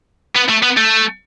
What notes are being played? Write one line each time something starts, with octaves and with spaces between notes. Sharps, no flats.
B3
A3
B3
A3